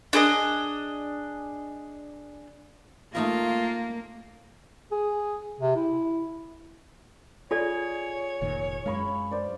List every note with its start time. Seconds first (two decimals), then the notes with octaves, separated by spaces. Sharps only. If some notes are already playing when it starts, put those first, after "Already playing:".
0.13 D4 G#4 C5 D#5
3.15 A3 A#3 D#4 F4 A#4
4.92 G#4
5.60 C3
5.76 E4
7.51 F4 G#4 A4 C#5 D5
8.41 F1 A#2 D#3
8.86 F#2 G#3 F5 B5 C#6
9.31 C5 D5